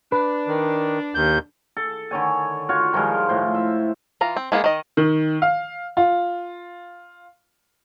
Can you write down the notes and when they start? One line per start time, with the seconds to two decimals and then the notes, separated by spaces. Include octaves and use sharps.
0.12 D4 B4
0.47 D#3
1.15 D#2 G6
1.77 A4
2.11 D3 D#3 C#5 G#5
2.69 F4 F#4 C#5
2.93 D#3 F3 G3 G#3
3.29 A2 C5
3.54 E5
4.21 E3 F4 A#5
4.37 C4
4.52 G#3 A#3 B3 G#4
4.64 D#3 D#5
4.97 D#3
5.42 F5
5.97 F4